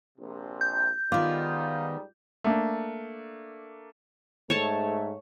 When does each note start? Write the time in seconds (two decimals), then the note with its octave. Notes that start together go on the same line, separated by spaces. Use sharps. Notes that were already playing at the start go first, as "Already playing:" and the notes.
0.18 A#1 C3
0.61 G6
1.12 G#2 D#3 G3 B3 D#4 F4 D6
2.44 A3 A#3 D4
4.50 G#2 A3 C#5 A5